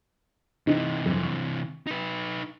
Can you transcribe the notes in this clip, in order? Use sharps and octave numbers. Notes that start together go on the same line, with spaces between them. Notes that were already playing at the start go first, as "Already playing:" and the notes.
C3 E3 D#4
F2
C#6
D#4 B4